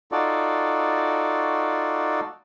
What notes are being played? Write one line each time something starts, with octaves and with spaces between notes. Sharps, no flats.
D#4 F4 F#4 A4 D5